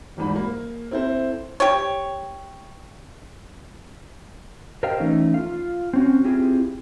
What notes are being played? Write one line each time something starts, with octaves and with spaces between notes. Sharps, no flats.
D#1 E2 G#2 B5
A#3
C4 E4 A4 C5
G4 C#5
G4 A#4 C5 D#5 F5 G5
E3 A3 C#4 D#4
F4 F5
C4 C#4 F#4
C4 E4 F4 G4 G#4